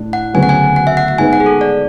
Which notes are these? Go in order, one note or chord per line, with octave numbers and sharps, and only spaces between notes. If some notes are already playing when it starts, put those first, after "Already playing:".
Already playing: A2 D4
F#5
D2 C#3 F#3 B3 F#4 G#5
F#5
G#5
F#5
E5
F#5
F#5
G#2 G#3 B3 G#5
F#5
G#4
A4
D5